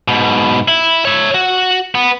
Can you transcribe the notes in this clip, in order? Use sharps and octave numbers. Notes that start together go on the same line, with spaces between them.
G#2 B2
E4
C#5 E5
F#4
B3